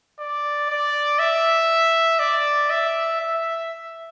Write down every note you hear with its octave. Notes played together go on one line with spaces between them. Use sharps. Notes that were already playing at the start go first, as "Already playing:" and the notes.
D5
D5
E5
D5
E5
E5